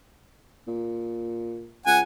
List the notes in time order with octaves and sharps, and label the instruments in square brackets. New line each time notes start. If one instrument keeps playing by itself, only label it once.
[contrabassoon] A#2
[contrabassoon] C#2 [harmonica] F#5 G#5